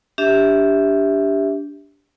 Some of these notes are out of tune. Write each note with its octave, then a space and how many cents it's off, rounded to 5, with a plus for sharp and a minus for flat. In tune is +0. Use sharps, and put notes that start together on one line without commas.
D4 -20 G4 +5 E5 -10